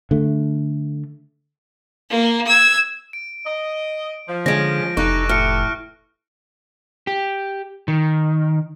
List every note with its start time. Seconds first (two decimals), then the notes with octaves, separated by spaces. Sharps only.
0.11 D3 A3
2.10 A#3
2.47 E6 G#6
3.13 D7
3.46 D#5
4.28 F3
4.46 D3 G#3 C#4 A#6 D7
4.97 F1 E3 D#4 G4 A4 C#6 F#6 D7
5.29 A2 F6 C#7
7.07 G4
7.88 D#3